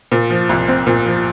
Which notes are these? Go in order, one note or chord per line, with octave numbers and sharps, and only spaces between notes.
A#2
F3
C2
C4
A#2
F3